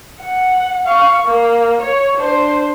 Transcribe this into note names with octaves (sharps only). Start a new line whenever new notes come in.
F#5
F5 C#6
A#3
C#5
D4 C5